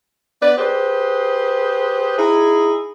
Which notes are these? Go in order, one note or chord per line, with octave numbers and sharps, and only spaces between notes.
B3 B4 D5
G4 G#4 B4 C5
D#4 E4 G#4